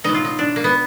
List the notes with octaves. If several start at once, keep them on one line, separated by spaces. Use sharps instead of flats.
B2 F#3 D#4
F4
D#4
D4
A#3
B3